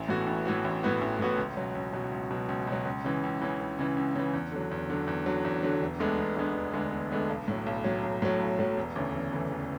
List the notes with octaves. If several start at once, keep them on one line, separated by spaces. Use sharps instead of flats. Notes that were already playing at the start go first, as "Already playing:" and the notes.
Already playing: A1
A2 E3 B3 F#4
A1
A2 E3 B3 F#4
A1
A2 E3 B3 F#4
A1
A2 E3 B3 F#4
C#2
B2 F#3
C#2
B2 F#3
C#2
B2 F#3
C#2
B2 F#3
C#2
C#3 E3
C#2
C#3 E3
C#2
C#3 E3
C#2
C#3 E3
E2
D3 F#3
E2
D3 F#3
E2
D3 F#3
E2
D3 F#3
E1
D2 D3 G#3 B3
E1
D2 D3 G#3 B3
E1
D2 D3 G#3 B3
E1
D2 D3 G#3 B3
B1
A2 F#3
B1
A2 F#3
B1
A2 F#3
B1
A2 F#3
E1
D2 C#3 E3
E1
D2 C#3 E3
E1